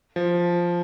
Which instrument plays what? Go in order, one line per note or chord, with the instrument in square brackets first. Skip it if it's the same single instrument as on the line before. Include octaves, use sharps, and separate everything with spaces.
[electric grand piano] F3